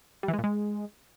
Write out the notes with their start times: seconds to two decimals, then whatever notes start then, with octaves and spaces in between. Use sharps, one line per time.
0.23 G3
0.28 E3
0.33 G#3
0.39 A#2
0.44 G#3